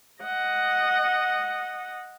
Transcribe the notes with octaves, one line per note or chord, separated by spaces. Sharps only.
D#5 F#5